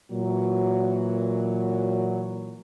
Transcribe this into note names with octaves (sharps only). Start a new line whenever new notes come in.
A#2 E3 F#3